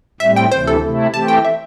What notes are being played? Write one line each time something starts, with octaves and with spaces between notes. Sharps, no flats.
A2 G3 C4 E5
G5
D2 C3 E3 C5
A4
C3 A3 E4
E3 A3 C4 G4 A5
G5
E5